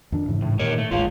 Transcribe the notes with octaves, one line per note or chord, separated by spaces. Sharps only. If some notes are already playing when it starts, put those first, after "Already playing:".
F2 D#3 D4
G#2 C#3 E3
A2
A#2 D#3 G4 A#4 C#5
A3
D1 G#1 G#3 F4 C#5 F5